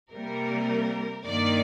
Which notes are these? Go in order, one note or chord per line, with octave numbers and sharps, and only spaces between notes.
C3 G3 A#3 A#4
G2 D#3 A#3 D5